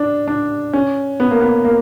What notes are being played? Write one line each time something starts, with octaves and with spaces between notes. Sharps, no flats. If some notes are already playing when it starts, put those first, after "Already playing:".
Already playing: D4
D4
C#4
B3
A#3
B3
A#3